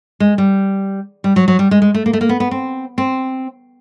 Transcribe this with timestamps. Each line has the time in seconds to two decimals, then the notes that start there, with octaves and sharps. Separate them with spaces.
0.20 G#3
0.38 G3
1.24 G3
1.36 F#3
1.48 F#3
1.59 G3
1.71 G#3
1.82 G#3
1.94 A3
2.06 A#3
2.13 A3
2.21 A#3
2.29 B3
2.40 B3
2.51 C4
2.98 C4